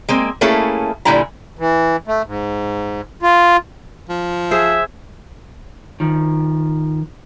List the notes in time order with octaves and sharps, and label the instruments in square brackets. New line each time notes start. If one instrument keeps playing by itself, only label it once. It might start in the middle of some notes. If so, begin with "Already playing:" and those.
[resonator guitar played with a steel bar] G#3 A#3 C4
A3 A#3 C#4 E4 G#4 A4
A#2 D3 G3 E4 G#5 A#5
[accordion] E3
A3
G#2
F4
[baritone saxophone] F3
[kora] G#4 C5 [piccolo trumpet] E5
[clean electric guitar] D#3 F3